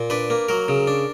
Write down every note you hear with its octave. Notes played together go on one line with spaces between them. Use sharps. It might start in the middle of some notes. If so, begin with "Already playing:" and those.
Already playing: A#2
D4 B4
A#3
F#3 A#4
C#3
D4